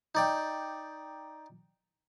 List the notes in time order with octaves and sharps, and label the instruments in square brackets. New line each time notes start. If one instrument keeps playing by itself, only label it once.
[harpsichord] D#4 D5 G5